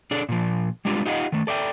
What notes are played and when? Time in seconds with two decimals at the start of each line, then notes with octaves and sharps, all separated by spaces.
0.11 D4 G#4 A4 D5
0.29 A#2 F3
0.85 G3 G#3 D4 F4 G4
1.06 D#4 F4 G4 D#5 F5 F#5
1.32 D#3 A3
1.47 A4 D5 E5 G5